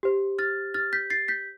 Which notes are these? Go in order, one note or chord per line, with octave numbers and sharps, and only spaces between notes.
G4 C5
F6 A6
F6 A6
G6 B6
A6 C7
G6 B6